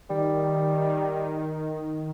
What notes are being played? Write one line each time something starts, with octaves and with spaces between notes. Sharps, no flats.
D#3 G3